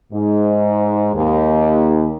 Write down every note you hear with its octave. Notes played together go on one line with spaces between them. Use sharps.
G#2
D#2